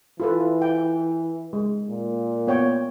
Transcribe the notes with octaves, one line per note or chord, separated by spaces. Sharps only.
E3 F4 A4 B4
G5
G#3
A#2
B3 C#5 G5